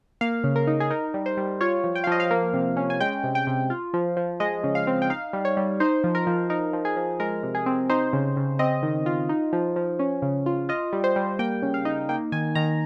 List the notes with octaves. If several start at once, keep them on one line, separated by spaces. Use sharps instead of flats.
A#3 F5
C#3
A#4
D#4
G#4
D#4 A#4
G3
C5
G3
F4 C#5
F3
G5
F5
F3 D#5
F5
A#3
C3
C#4
G#5
G#3 G5
C3
G5
C3
F4
F3
F3
G#3 D#5
C#3
F5
C4
G5
D#4 F5
G3
C#5
G3
D#4 C5
F3
A#4
F3
D#4 A#4
F3
G#4
F3
G#3 A#4
C3
G#4
C4
D#4 C5
C#3
C#3
C4 D#5
D#3
F4
D#4
F3
F3
C#4
C#3
F4
F4 D#5
G3
C5
G3
A#3 G5
C#3
F5
D#4
A#3 G5
D#3 G#5
D#3 A#5